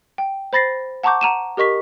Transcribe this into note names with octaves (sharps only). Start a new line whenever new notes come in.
G5
C5 B5 A6 A#6 C7
F#5 A5 A#5 C#6 D6 G6
F#5 A#5 D#7 E7
G4 A#4 D#5 C#6 B6